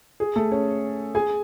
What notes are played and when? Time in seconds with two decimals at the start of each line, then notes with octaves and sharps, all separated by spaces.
0.20 G#4
0.36 A3 A4
0.51 C#4 C#5
1.15 G#4 G#5